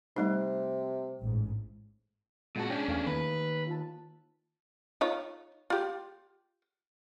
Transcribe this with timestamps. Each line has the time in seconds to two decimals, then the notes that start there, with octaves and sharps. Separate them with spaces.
0.16 C3 G3 A3 D#4
1.20 A1 G#2
2.56 A#2 G#3 F#4 F#5 A5
2.70 C#4 D4 G#4 C#5 G5
2.88 E2 A3 F5 G#5
3.06 D#3 A#3 B4
3.67 F4 A5
5.01 D#4 F4 C#5
5.70 F4 G4